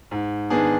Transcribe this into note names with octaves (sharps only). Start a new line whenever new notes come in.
G#2
D#3 B3 D4 G#4